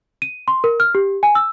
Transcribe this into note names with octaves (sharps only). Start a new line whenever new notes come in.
D#7
C6
A#4
F6
G4
G#5
E6